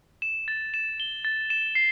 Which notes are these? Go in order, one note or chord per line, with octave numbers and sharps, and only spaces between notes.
E7
A6
E7
G7
A6
E7
C7